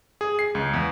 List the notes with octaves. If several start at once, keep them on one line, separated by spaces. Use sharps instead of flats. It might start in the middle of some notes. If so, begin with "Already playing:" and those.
G#4
C7
C#2
E2